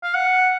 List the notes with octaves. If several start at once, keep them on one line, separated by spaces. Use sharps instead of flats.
F5
F#5